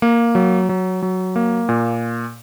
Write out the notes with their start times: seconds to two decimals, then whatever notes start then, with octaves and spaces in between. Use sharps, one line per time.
0.02 A#3
0.35 F#3
0.69 F#3
1.02 F#3
1.36 A#3
1.69 A#2